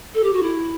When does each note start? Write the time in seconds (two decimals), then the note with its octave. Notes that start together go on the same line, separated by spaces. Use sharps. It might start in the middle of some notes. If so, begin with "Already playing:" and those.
0.14 A4
0.23 G4
0.33 F#4
0.42 E4